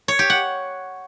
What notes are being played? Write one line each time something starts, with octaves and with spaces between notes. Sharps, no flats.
C#5
G4
F#5